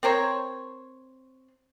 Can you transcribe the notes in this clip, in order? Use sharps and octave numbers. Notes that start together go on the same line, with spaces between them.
C4 A#4 C5 C#5